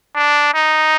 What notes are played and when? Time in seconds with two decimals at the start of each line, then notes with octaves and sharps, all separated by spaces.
0.15 D4
0.54 D#4